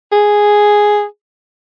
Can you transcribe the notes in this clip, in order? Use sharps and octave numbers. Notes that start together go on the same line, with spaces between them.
G#4